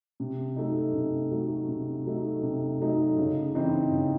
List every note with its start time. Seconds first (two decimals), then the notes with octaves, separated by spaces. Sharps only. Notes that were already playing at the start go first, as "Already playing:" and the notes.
0.20 C3
0.56 F#3 A3 D#4
0.94 C3
1.31 F#3 A3 D#4
1.68 C3
2.06 F#3 A3 D#4
2.43 C3
2.81 F#3 A3 D#4
3.18 C#3
3.55 E3 C4 D#4
3.92 C#3